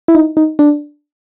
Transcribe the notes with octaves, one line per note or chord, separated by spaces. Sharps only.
E4
D#4
D#4
D4